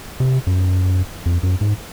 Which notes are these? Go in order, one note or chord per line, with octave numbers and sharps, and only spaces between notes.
C3
F#2
F2
F#2
G#2